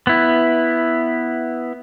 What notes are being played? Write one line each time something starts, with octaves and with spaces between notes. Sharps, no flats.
B3 E4